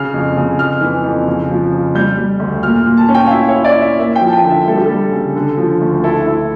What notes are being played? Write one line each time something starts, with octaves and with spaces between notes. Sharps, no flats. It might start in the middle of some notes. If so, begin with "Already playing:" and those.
Already playing: C#3 F6
F2
C#3
F2 F6
E3
F2
C#3
F3
C#3
G3 G6
G3
D2
A#2 F6
A#2
A5
C#4
G5
F5
E4 E5
C#5
E4
D5
E4
E5
A#3 E5
G5
F3
A5
G5
D3
E5
G3 A4
G4
G3 A4
C#3
D3
F3
D2
E4 A4
E4